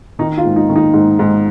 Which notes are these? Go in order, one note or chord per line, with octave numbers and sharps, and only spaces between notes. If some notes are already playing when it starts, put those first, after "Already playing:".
D#3 D#4
F4
G#2
D#4
D#3
D#4
G#2
G#2